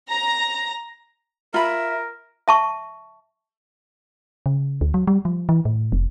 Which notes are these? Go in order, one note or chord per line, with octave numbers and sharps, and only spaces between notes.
A#5
F4 A#4 E5 B5
E5 A5 C#6
C#3
D2
F#3
G3
F3
E3
A2
F1